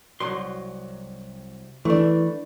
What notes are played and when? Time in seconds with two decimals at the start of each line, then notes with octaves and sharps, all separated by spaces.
0.20 C2 F#3 C6
1.85 E3 A3 D4